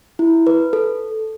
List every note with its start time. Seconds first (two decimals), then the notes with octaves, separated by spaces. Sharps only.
0.19 E4
0.47 B4
0.73 A4